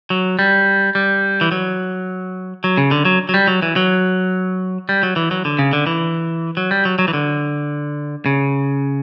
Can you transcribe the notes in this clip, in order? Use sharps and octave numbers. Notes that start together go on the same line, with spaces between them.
F#3
G3
G3
E3
F#3
F#3
C#3
D3
F#3
F#3
G3
F#3
E3
F#3
G3
F#3
E3
F#3
D3
C#3
D3
E3
F#3
G3
F#3
F#3
E3
D3
C#3